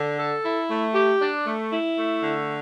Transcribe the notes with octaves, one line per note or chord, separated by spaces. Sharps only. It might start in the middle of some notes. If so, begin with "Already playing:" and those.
Already playing: D3
A4
E4
A3
G4
D4
A3
E4
A3
D3